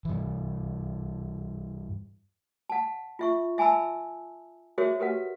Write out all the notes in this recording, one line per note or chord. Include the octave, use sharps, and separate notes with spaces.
G2 E3
F#5 A5
F4 E5 C#6
E5 G#5 A5 B5 E6
F#4 G#4 A#4 C5 C#5 E5
G4 A#4 B4 F#5